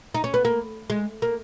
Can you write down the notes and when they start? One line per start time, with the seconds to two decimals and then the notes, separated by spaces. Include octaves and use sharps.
0.14 D#4
0.24 C#4
0.34 B3
0.45 A#3
0.90 G#3
1.22 A#3